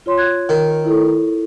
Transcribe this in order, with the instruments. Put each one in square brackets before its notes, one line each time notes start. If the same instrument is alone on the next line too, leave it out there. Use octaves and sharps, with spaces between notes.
[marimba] F4 C#5 C6
F#6 G#6
[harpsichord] D#3
[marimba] A#4
E4 A4